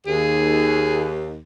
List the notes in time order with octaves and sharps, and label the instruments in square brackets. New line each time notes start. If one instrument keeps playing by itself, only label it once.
[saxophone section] D#2 [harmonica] G#4